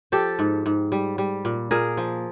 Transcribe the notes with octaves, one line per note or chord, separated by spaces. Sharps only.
F3 G4 A4
G#2
G#2
G3
G3
A#2
A#2 G#4 A#4
F3